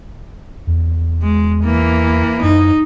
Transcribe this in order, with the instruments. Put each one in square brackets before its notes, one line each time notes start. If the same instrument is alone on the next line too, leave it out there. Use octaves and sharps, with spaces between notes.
[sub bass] E2
[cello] G#3
E3 A#3
[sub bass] F#2 [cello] D#4